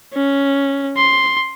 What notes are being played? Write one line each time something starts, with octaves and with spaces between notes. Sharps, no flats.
C#4
C6